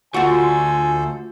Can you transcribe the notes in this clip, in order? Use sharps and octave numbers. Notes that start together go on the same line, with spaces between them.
D2 D3 F4 F#4 A4 C5 G#5